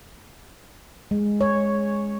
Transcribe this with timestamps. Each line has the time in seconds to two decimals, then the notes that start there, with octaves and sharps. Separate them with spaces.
1.11 G#3
1.41 C#5